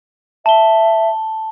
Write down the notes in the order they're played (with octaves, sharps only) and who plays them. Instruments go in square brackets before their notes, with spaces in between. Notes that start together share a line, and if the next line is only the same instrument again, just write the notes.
[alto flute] E5 [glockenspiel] A5 G7